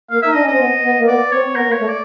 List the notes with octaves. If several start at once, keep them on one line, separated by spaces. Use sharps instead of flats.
A#3 F5
D#4 E5
D4 D#5
C#4
C4 D#5
B3
B3
A#3
B3 D5
C4 C#5
B3 A#4
A#3
C#5
A3
D5